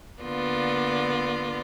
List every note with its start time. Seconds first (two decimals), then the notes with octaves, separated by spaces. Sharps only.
0.23 D3 A#3 B3 F4 D5